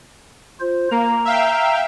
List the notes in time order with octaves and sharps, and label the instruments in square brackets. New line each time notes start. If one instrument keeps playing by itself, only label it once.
[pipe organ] F4 C5
[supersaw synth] A#3 [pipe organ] A#5
[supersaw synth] E5 F5 G5